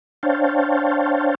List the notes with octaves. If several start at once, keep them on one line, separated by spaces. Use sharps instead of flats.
D4 C5 C#5 F5 G5 A5